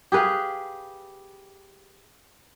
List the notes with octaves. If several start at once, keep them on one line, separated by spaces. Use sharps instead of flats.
G4 G#4 B4 F5